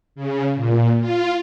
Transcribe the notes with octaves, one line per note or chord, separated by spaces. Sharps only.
C#3
A#2
F4